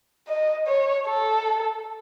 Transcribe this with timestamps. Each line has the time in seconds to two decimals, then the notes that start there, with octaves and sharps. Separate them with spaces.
0.28 D#5
0.67 C#5
1.07 A4